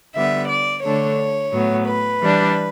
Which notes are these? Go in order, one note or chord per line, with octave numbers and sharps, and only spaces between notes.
D3 G3 B3 E5
D5
D3 A3 D4 C#5
A2 F#3 B3
B4
E3 G3 D4